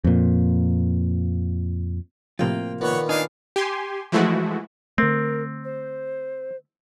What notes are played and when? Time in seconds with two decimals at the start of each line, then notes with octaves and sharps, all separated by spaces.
0.04 F2 A#2
2.39 A2 C3 F3 A#3 F4 G5
2.81 A#2 D#3 B3 C#5 F#5
3.09 D4 D#4 F5 G#5
3.56 G4 G#5 C6
4.12 E3 F3 G#3 A3 E4 F#4
4.98 D3 A3 C4 A#4
5.64 C5